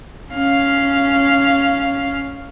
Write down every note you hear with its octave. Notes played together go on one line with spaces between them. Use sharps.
C#4 F5